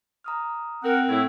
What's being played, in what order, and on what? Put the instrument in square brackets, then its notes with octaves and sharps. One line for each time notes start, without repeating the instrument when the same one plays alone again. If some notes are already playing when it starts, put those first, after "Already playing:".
[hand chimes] A#5 D#6 F6
[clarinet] C4 [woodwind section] A#4 F#5
[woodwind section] A2 A3 E4 [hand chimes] A4 F#5 G#6